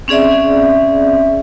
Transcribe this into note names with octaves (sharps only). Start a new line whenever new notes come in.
C4 C#4 G#4 D5 E5